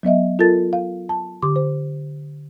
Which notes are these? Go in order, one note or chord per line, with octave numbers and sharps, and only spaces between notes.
F#3 B3 D#5 E5
F4 A4 A#4 A5 A6
F5
A5
D3 G4 C6 D6
C5